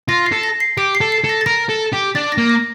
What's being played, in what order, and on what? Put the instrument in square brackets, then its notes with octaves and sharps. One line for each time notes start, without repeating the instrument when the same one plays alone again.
[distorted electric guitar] F4 [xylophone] A#6
[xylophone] C7
[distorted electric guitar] A4
[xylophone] A#6
C7
[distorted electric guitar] G4 [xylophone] D7
[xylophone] C7
[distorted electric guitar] A4
[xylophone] C7
[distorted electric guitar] A4
[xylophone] A#6
A6
[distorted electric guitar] A#4 [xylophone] A#6
[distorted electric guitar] A4
G4
[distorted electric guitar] D4 [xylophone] A6
[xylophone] A#6
[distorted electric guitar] A#3
[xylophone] A#6